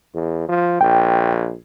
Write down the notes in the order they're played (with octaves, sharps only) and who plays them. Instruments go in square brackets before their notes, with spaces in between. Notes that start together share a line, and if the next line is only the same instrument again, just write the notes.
[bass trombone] E2
F3
[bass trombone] A#1 [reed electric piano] G5